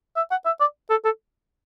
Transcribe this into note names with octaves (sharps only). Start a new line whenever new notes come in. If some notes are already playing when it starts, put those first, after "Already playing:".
E5
F#5
E5
D5
A4
A4